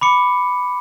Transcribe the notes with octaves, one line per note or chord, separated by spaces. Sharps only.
B5 D6 C#7